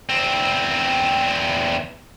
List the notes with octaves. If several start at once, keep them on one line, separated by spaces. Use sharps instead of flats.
E2 C4